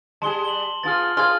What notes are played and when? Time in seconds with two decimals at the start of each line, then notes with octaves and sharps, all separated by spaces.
0.22 G3 G#4 A5 C6 G7
0.45 F#7 G7
0.83 B3 F4 G#4 F6 A6
1.17 F4 G#4 F6 G#6